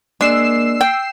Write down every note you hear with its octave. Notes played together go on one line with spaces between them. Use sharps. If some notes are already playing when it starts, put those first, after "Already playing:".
G#3 A#3 D4 E6 C7 E7
G5